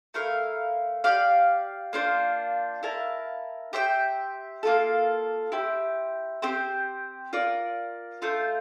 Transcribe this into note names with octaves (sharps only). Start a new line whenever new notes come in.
A3 E4 A#4 F5
G4 D5 F5
A#3 D4 F4 C5
E4 A#4 F5 A5
G4 C5 E5 G5
A#3 F4 A4
E4 G4 C5
C4 G4 C5
F4 A#4 D5
A3 D4 F4 C5